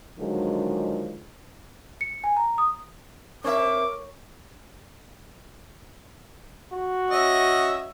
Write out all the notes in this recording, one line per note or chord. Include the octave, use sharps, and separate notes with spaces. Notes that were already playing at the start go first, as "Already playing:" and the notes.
D3 D#3 F3 F#3 G#3
C#7
G#5
A#5
D#6
C4 A#4 C#5 E5 C#6 D6
F#4
C#4 D#5 E5